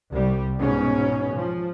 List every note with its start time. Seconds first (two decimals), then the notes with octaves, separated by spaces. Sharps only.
0.11 C2 G3
0.60 G#2 B2 C#4
1.35 F3